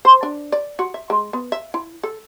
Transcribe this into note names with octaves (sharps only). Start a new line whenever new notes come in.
C5
D4
D5
F#4
E5
G#3
B3
E5
E4
A4